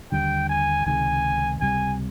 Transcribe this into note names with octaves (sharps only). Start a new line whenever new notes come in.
D#2 D3 G3 G5
G#5
C#2 C3 D#3 G#3 G#5
C#2 C3 E3 G3 G#5